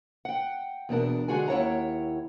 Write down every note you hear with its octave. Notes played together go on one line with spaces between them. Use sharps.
F#5 G5
E2 B2 D4 A#4
D3 G#3 F#4 G#4 G#5
D#2 E4 C#5 F#5 A#5